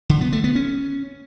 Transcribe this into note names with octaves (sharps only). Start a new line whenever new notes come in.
D3
B3
A3
B3
C#4